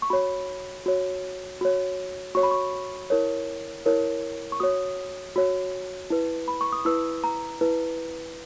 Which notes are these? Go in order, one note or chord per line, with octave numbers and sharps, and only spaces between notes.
C#6
F#4 C#5 B5
F#4 C#5
F#4 C#5
F#4 C#5 C#6
B5
C#6
E4 A#4 C#5
E4 A#4 C#5
C#6
F#4 C#5 D#6
F#4 C#5
E4 B4
B5
C#6
D#6
E4 B4 E6
A#5
E4 B4